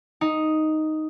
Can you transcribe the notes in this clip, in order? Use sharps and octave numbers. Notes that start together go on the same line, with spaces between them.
D#4